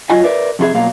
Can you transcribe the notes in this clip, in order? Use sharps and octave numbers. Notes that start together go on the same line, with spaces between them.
F#3 F4 D#5 G#5
A#4 B4 D5 E5
F2 C3 F4 G#4 E5
B2 F#3 A#3 F5